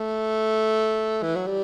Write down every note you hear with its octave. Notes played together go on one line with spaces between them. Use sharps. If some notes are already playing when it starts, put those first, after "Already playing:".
Already playing: A3
E3
F#3
G3